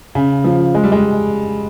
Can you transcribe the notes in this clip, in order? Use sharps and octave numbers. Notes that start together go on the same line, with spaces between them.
C#3
F3
G#3
G3
G#3